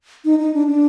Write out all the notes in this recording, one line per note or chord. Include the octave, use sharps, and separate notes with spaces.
D#4
D#4
D4
D4